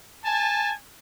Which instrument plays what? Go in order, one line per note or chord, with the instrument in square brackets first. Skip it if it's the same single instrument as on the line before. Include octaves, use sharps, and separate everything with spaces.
[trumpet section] G#5 A5